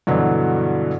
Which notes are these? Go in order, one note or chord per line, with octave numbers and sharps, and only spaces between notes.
G2 B2 D3 E3 F#3